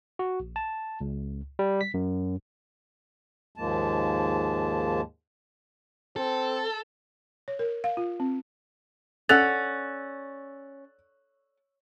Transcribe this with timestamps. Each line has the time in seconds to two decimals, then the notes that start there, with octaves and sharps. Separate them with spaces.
0.19 F#4
0.40 A#1
0.56 A5
1.01 C#2
1.59 G3
1.81 B6
1.94 F#2
3.56 D#2 G#2 F3 G#3 A#3 A5
6.16 C4 A4
7.48 C#5
7.59 A#4
7.84 F5
7.97 F4
8.20 C4
9.29 C#4 A4 D5 F#5 E6 F#6 A6 F7